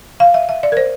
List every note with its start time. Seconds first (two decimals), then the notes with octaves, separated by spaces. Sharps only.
0.20 F5
0.34 E5
0.49 E5
0.63 D5
0.72 A#4
0.77 C5